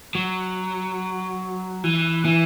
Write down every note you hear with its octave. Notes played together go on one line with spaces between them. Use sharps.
F#3
E3
E3